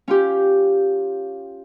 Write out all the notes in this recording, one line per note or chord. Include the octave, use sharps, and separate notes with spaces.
C#4 F4 G4